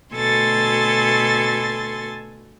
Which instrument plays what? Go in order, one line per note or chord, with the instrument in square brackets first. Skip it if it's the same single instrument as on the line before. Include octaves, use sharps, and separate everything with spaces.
[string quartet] D2 B2 A4 G#5 C6 A6